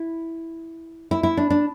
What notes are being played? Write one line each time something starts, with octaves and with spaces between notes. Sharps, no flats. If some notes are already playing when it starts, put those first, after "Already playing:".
Already playing: E4
E4
E4
D4
D4